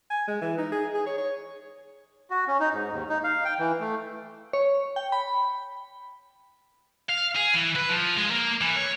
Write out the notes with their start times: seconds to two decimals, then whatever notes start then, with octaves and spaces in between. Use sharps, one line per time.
0.10 G#5
0.27 G#3
0.42 E3
0.58 D#4
0.72 G#4
0.94 G#4
1.06 C#5
1.18 C#5
2.30 F#4
2.47 C#4
2.60 D#4
2.73 G#2
2.91 D#2
3.09 D#4
3.24 F5
3.45 G5
3.59 E3
3.80 A3
4.53 C#5
4.96 G5
5.12 B5
7.09 F5
7.36 G#4
7.54 E3
7.76 B4
7.89 F3
8.17 G#3
8.31 A#3
8.61 E3
8.76 C#5